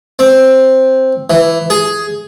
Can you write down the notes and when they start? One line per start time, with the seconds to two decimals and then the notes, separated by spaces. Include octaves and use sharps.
0.19 C4
1.30 E3
1.70 G#4